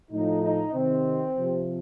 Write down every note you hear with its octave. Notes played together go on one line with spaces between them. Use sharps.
A2 F3 D#4
D#4
C3 D#3 C4
C3 F3